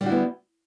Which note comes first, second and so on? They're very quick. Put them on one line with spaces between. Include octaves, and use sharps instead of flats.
G3 D3 F#4 E4 B3